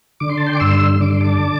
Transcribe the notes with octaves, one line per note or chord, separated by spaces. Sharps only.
D3 D6
C6
A5
G5 C6
D6
G2 C6 E6
D3 D6
C6
A5 D6